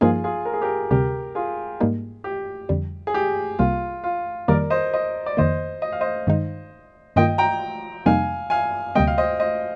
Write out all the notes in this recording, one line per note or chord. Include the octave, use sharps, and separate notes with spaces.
G2 F3 A#3 D#4 F4 G#4
F4 G#4
A#4
G#4
G4 A#4
D2 C3 G3 G4 A#4
F4 G#4
G#2 G3 A#3 D#4
G4
F2 D3 G3
G#4
G4
C2 C3 G3 A#3 F4
F4
F2 D#3 G3 A#3 D#4 A#4 D5
C5 D#5
C5 D#5
D5
F2 D#3 A#3 C5 D#5
D#5
F5
C5 D#5
G2 D#3 G#3 D#4
G2 D#3 A#3 F4 D#5 G5
G5 A#5
F2 C3 G3 A#3 D#4 F5 G#5
F5 G#5
D2 C3 G3 A#3 D#5 G5
F5
C5 D#5
C5 D#5